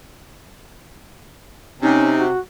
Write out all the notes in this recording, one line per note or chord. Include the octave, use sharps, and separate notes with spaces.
C3 C#4 D#4
F#4